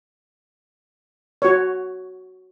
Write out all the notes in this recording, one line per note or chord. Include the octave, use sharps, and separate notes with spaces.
F#4 C#5